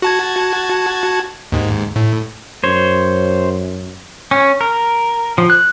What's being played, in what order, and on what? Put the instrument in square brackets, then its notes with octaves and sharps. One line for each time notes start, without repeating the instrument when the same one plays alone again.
[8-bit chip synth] F#4 A5 G#6
D#2 G#2
A2
[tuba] F#2 [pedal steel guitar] C5 C#5
[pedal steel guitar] C#4
A#4
F3
F#6